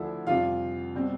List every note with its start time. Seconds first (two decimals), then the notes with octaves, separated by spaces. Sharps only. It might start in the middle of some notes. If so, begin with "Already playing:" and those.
Already playing: D2 D3 F3 A3 D4 E4 E5
0.27 F2 C3 G3 F4 F5
0.94 B2 G3 C4